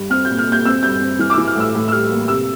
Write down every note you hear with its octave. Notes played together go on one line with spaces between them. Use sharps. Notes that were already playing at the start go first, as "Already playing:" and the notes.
Already playing: G2
C4 F6
A#2 G6
F6
A#2
G6
C4 E6
G2 G6
C4
E3 F6
D6
E6
E3
F6
A2 E6
A2
E6
G3 F6
A#3
C3 E6